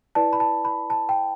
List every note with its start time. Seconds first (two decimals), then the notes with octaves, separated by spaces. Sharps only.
0.15 E4 B4 D5 A5
0.33 B5
0.40 A5
0.65 B5
0.90 A5
1.09 G5